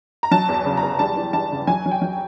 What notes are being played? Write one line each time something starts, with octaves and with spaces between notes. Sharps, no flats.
A#5
F#3 A5
E2
A5
C#3
A#5
E2
G3 A5
E3
G3 A5
C#3
F#3 G#5
F#3
G5
F#3